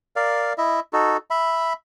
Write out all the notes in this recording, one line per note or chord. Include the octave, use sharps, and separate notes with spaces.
A#4 D5 F5
E4 D#5 E5
D#4 F#4 A4
E5 B5